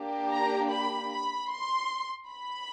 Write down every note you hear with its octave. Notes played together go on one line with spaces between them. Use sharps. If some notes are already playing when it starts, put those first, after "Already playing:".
Already playing: A#3 D4 G4
A#5
B5
B5
C6
B5